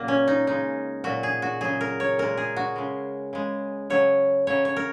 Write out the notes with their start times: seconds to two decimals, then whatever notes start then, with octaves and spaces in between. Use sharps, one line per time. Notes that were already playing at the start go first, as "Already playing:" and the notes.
Already playing: A#2 C#3 F#3 A#3 A#4
0.08 C#4
0.28 D#4
0.47 C#3 G#3 D#4
1.04 A#2 F#3 F#4
1.23 G#4
1.42 F#4
1.61 C#3 F#3 G#4
1.81 A#4
2.00 C#5
2.18 A#2 G#3 A#4
2.37 G#4
2.56 F#4
2.76 C#3 G#3
3.33 C#3 G#3
3.90 C#3 F#3 C#5
4.47 C#3 F#3 C#5
4.65 C#5
4.76 A#4